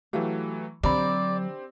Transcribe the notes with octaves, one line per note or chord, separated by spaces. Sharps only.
E3 F#3 A3 G4 F5 F#5
D3 F#3 C4 D4 G4 D5 A#5 B5